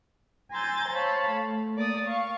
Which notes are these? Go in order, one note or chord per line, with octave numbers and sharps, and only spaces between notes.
G#5 A#5 C6 E6 G6 A6
C5 C#5 F5 A5 B5
A3
A#3 D5 D#6
F5 C#6